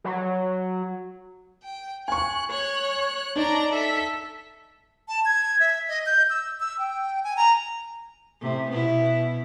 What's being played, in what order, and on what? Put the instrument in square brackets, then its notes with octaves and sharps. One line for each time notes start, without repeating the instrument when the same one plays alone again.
[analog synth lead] F#3
[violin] G5
[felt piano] G#5 C#6 [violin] F#6
[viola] C#5 [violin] F#6
[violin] D4 A#5 [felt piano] D#4 [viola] D5
[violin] A4 B6 [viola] E5
[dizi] A5
G#6
E5
D#5
G6
E6
E6
G5
G#5
A#5
[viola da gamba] A2 C3
B2 B3 E4